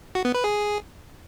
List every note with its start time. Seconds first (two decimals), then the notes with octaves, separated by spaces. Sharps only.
0.15 F#4
0.25 B3
0.34 B4
0.44 G#4